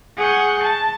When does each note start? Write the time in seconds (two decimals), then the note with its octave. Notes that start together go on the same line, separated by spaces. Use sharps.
0.18 G#4 F#5 C#6 F#6 G6
0.62 A5